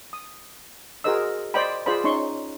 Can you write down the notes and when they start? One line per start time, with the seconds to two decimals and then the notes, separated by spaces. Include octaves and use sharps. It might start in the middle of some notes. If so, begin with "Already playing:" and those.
0.13 D#6
1.04 F#4 G#4 A#4 C5 D#5 E6
1.54 C5 D5 D#5 G5 B5
1.86 F4 G#4 C5 D5 B5
2.04 C#4 D#4 C6 C#6